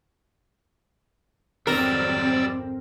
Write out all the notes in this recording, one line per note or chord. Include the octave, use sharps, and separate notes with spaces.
G#1 F2 F#3 G3 C4 A#4 D5 E6